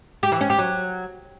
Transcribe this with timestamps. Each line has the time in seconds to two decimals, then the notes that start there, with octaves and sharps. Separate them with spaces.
0.23 G4
0.32 E3
0.41 C#4
0.50 G4
0.59 F#3